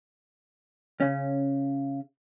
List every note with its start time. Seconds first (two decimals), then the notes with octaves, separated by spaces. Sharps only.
1.00 C#3 C#4